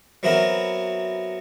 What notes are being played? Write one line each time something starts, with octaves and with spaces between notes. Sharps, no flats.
F#3 B3 C4 E4 F#4 A#4